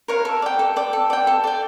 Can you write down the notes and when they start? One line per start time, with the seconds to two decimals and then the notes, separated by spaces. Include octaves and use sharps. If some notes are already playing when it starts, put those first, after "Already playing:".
0.08 A#4 C#5 F5
0.25 A4
0.42 D5 G5
0.59 A4
0.76 D5 G5
0.93 A4
1.10 D5 G5
1.27 A4
1.44 D5 G5